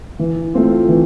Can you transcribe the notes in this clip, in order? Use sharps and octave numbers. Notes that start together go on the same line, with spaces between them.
E3
A3 C4 F4
E3